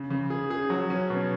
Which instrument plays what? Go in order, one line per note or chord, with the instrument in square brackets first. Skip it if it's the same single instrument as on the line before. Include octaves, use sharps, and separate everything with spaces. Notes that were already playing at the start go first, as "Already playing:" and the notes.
Already playing: [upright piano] C#3
C#3
G#4
G#4
F#3
C#4
B2